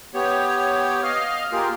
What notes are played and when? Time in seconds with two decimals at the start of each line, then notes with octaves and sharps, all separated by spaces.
0.14 B3 G4 C#5
1.03 D#5 F5 F6
1.52 A#3 F4 G4 G#4 A#4